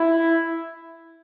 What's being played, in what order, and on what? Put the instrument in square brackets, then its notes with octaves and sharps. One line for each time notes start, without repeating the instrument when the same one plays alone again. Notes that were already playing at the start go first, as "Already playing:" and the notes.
Already playing: [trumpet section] E4